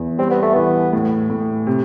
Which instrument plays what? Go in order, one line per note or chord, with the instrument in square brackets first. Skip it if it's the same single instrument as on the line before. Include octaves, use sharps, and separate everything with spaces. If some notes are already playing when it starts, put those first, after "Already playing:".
Already playing: [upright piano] E2
[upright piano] G3 [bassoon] C4
[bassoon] B3
A3
[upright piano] E3 [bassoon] B3
[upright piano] A2
A2
C3